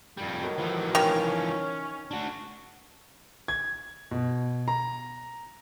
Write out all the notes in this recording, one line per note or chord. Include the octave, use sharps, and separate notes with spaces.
F2 G3
A2 D#3 F#3
E3 F3
D#3 C#4
D4 F#4
G#6
B2
A#5